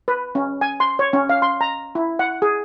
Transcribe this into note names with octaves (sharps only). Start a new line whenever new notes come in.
B4
C#4
G#5
C6
C#5
C#4
F5
C6
A#5
E4
F#5
G#4